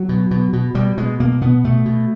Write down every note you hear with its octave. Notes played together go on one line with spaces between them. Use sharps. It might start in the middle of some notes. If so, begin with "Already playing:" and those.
Already playing: F#3
B2
B2
B2
B2 G3
B2 G#3
B2 A#3
B2 B3
B2 A3
B2